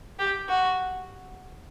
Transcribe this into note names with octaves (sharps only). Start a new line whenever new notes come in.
G4
F#4